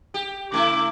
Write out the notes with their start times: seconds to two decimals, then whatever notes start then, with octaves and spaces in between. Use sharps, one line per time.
0.14 G4
0.52 C#3 A3 E4 D6